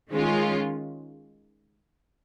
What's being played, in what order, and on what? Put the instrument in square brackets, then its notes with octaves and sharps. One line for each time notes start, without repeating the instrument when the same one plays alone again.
[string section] D#3 G#3 C#4 F4